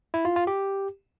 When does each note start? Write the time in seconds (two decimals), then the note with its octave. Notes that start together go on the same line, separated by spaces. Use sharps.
0.14 E4
0.25 F4
0.36 F4
0.47 G4